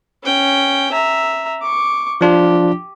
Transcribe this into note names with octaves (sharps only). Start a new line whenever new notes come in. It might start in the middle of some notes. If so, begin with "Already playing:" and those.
C#4 G5
E5 A#5
C#6 D6
F3 D4 F4 G4